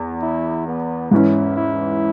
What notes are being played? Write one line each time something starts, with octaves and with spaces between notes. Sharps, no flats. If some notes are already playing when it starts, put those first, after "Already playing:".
Already playing: E2
E4
B3
G#2 E3 C#4 E4
E4